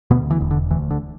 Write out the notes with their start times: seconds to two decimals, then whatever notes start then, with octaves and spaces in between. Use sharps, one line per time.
0.11 D2 B2 B3
0.31 E3
0.40 E1
0.51 D3
0.70 D2 E3
0.91 D3